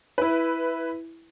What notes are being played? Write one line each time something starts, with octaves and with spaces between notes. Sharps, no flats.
E4 B4